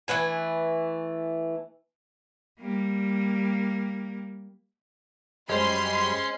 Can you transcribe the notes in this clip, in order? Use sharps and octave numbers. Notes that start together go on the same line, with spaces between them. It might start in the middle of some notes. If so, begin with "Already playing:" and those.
E3 A3 B4 G#5
G3 A#3
F#2 G3 G#3 C#4 C5 B5 C6